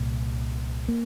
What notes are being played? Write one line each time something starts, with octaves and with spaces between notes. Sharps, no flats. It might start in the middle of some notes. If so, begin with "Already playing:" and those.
Already playing: C2 A#2
A#3